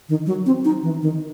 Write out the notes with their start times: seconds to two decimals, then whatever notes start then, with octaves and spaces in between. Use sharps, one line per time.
0.09 D#3
0.26 F#3
0.46 C4
0.65 D#4
0.83 E3
1.02 D#3